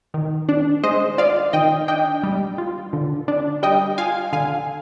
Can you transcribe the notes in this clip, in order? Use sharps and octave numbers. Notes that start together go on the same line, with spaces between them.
D#3
D4
G#3 C5 D#5
F4 D5 F5
D#3 D#5 G5
D4 D#5 G5
G3
F4
D3
D4
G3 D#5 G5
F4 F5 G#5
D3 F5 G#5